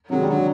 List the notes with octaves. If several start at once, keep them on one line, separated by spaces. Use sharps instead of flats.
C3 D#3 F#3 G#3
G3
D3 F#3